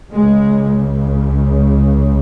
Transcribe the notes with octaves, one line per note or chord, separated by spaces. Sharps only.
C#2 C#3 G#3